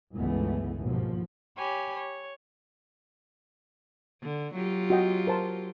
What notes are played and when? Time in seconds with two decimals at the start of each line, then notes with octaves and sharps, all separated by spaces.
0.14 G1 C#2 E3 G#3 A3 B3
0.82 D#2 G#2 B2 F3
1.57 G4 C#5 G#5 B5
1.96 C#5
4.22 D3
4.54 F#3 F4 G4
4.90 F#4 D#5 G5
5.27 A#4 C5 A5